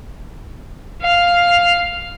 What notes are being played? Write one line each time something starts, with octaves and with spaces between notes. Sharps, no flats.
F5